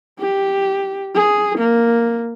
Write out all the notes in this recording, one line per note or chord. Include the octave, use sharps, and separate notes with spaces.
G4
G#4
A#3